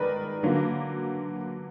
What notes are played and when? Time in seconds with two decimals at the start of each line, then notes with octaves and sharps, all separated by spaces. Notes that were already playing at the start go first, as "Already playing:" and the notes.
Already playing: D#3 G#3 B3 A#4 B4 D5
0.43 D3 F#3 A#3